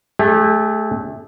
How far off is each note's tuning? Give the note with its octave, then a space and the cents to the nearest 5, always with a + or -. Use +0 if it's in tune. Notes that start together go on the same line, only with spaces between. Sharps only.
A3 -20 G4 +45